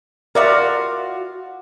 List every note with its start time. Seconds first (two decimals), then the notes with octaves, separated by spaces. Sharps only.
0.35 F4 F#4 A#4 D5 E5 F5